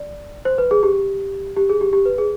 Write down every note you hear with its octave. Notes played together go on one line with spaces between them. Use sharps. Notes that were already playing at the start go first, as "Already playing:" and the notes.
Already playing: D5
C5
B4
G#4
G4
G4
G#4
G4
G4
B4
G#4